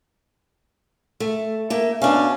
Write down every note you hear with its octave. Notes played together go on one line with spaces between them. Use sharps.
A3
A3 A#3
B2 C#4 D4 F5